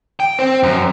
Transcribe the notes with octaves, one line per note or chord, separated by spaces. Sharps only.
G5
C4
F#2